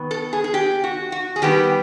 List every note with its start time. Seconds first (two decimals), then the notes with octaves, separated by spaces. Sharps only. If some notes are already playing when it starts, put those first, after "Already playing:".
Already playing: D#3 B3
0.11 A4
0.33 G#4
0.44 G#4
0.54 G4
0.84 F#4
1.12 F#4
1.36 G#4
1.42 D#3 G3 B3 G4